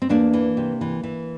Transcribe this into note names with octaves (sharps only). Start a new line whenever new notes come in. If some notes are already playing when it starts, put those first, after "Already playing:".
C4
E2 A#3 D4
E3
C3
E3
E3